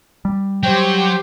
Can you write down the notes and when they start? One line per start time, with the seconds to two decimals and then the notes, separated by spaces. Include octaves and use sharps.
0.25 G3
0.63 F#3 G4 C5 G5